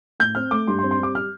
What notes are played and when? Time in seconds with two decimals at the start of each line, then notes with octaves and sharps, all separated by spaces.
0.20 A2 G6
0.35 C4 F6
0.51 A3 D6
0.67 G2 C6
0.79 C6
0.83 C4
0.91 C6
0.99 G3 D6
1.15 F6